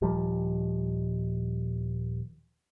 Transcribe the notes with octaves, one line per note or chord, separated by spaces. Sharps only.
D#1 D#3 F3 G3